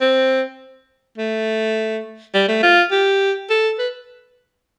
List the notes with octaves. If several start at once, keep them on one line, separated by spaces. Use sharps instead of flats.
C4
A3
G3
A3
F4
G4
A4
B4